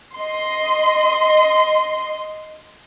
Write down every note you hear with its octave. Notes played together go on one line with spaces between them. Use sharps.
D#5 C6